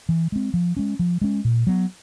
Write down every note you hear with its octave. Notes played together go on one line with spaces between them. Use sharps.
E3
G#3 C4
F3
G#3 C#4
F3
G#3 C#4
A#2
F#3 B3